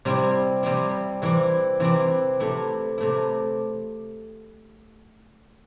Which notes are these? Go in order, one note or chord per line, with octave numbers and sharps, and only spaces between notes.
C3 G3 C4 E4
C3 G3 C4 E4
C3 E3 C4 E4
C3 E3 C4 E4
C3 A3 E4
C3 A3 E4